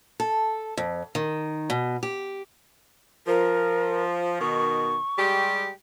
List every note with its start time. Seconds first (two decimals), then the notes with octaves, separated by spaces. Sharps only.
0.20 A4
0.77 F2
1.15 D#3
1.70 B2
2.03 G4
3.27 F3 A#4
4.41 B2 D#3 C#6
5.18 G3 G#3 G4